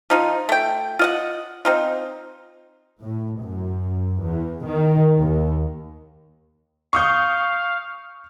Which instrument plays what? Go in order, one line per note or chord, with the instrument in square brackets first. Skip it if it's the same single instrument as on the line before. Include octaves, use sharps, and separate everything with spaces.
[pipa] F3 D#4 F4
A3 G5
F4 D#5 F#5
C4 D#4 F4
[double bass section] A2
F#2
E2
D#3
D#2
[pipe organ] F5 [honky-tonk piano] C#6 D#6 G6